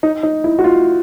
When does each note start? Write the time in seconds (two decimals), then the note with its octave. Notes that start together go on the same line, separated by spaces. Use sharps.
0.03 D#4
0.23 D#4
0.44 E4
0.59 F#4
0.64 F4